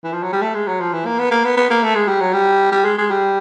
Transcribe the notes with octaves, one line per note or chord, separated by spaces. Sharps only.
E3
F3
F#3
G3
A3
G#3
F#3
F3
E3
A#3
B3
A#3
B3
B3
A#3
A3
G#3
G3
F#3
G3
G3
G#3
G#3
G3